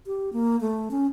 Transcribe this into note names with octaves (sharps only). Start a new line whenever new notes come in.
G4
A#3
A3
C#4